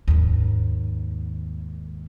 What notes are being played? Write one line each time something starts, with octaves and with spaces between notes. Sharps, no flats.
D#2 G#2